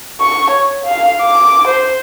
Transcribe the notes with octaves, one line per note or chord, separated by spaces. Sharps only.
C#6
C#5
F5
D6
C5